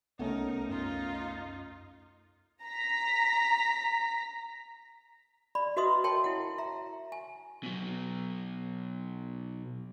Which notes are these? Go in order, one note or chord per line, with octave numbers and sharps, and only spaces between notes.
C2 A3 B3 C#4 D#4 A#4
F#2 D#4 F4
A#5 B6
D5 B5
F#4 B4 D#5 E5 C6 D#6
A#4 C#5 G5 A5 C6
E4 F#5
E5 A#5
G#5
B2 F#3